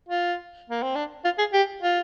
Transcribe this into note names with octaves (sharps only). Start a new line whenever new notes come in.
F4
A#3
C4
D4
F4
G#4
G4
F4